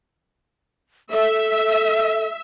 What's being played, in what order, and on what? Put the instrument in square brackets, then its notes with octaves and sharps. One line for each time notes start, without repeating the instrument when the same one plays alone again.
[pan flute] A4 [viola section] E5